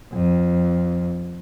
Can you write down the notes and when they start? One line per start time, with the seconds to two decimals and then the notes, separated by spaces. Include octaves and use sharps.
0.13 F2